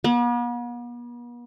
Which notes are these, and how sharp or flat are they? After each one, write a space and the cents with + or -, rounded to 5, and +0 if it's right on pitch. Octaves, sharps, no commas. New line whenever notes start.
B3 -45